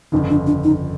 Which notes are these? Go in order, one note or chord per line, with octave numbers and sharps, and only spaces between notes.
G1 F2 C#3 D#4
D4
D4
D#4